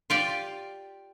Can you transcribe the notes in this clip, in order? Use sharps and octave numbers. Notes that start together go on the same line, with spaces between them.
F4 G4 D5